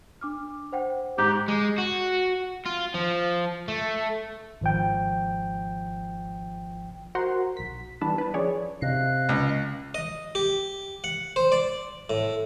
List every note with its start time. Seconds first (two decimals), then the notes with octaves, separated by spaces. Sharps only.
0.21 D4 D6 F6
0.72 C5 F#5 G5
1.18 G#2 G4
1.49 G#3
1.79 F#4
2.66 F4
2.94 F3
3.68 A3
4.61 G#1 F3 G5
7.15 F#4 A#4 C5 F#5 A#5 C6
7.57 B1 B6
8.01 E3 G3 B3 D4 B4 A5
8.18 B4 A5
8.34 F3 C#4 G#4 C#5 D5
8.82 C3 D#5 F5 F#6
9.29 C#2
9.95 D#5
10.35 G4
11.04 F#5
11.36 C5
11.52 D5
12.10 A2